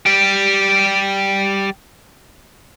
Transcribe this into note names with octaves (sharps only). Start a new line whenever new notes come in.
G3 G4